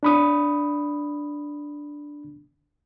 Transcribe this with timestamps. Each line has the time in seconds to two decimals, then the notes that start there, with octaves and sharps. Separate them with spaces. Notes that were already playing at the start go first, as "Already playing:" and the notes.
0.03 D4 B5 D#6